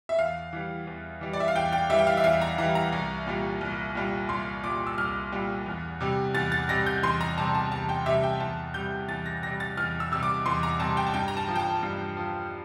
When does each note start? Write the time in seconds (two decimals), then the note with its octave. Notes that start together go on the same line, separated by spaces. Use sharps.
0.09 E5
0.18 E2 F5
0.53 E3 G3
0.87 E2
1.21 E3 G3
1.33 D5
1.40 E5
1.48 F5
1.55 E2 G5
1.72 G5
1.90 E3 G3 E5
1.99 G5
2.07 F5
2.17 E5
2.24 E2 F5
2.41 A#5
2.58 E3 G3 A#5
2.75 A#5
2.93 C2
3.27 A#2 G3
3.61 C2
3.95 A#2 G3
4.29 C2 C6
4.64 A#2 G3 D6
4.87 E6
4.98 C2 F6
5.32 A#2 G3
5.66 E2
6.01 C3 G3
6.35 E2 A6
6.52 A6
6.69 C3 G3 A#6
6.86 G6
7.03 E2 C6
7.21 A#5
7.38 C3 G3 A5
7.55 A5
7.71 E2 A5
7.89 G5
8.06 C3 G3 E5
8.23 G5
8.40 E2 A5
8.74 C3 G3 G6
9.08 E2 A6
9.26 A#6
9.42 C3 G3 A#6
9.60 A6
9.77 E2 F6
10.00 E6
10.12 C3 G3 E6
10.23 D6
10.46 E2 C6
10.63 A#5
10.80 C3 G3 A5
10.97 G5
11.07 A5
11.14 G2 G5
11.28 A#5
11.37 A5
11.48 F3
11.55 G5
11.60 A5
11.83 G2
12.17 F3